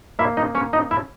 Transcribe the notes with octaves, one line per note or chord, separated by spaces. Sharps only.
A#3 E4 E5
D#4 D#5
C#4 C#5
D#4 D#5
E4 E5